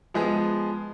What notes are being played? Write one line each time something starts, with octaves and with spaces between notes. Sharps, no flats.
F3 G#3 B3 G#4